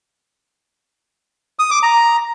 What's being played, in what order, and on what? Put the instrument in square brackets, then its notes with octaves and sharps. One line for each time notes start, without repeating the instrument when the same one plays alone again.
[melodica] D#6
D6
A#5